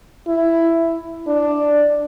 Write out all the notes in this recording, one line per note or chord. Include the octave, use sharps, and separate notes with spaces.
E4
D4